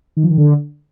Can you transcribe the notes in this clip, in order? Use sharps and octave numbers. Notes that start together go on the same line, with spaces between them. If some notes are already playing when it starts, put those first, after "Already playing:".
D#3
F3
D#3
D3